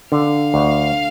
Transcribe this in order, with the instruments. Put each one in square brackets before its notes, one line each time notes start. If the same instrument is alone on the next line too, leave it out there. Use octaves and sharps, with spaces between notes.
[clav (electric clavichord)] D3 [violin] F5
[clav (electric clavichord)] D2